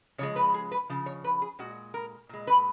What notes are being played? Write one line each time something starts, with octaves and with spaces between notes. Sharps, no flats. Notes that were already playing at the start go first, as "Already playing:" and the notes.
C#3 F3 G#3 C#5
B4
G#4
B4
C#3 F3
C#5
B4
G#4
A#2 G#3 F#4
A#4
A#2 G#3
B4